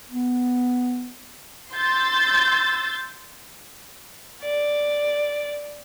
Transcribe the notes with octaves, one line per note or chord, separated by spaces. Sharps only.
B3
C6 E6 G6 A6
D5